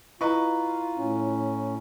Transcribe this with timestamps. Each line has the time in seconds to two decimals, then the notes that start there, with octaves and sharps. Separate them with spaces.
0.21 E4 F4 B4 D#5 A#5 C#6
0.98 A2 C#4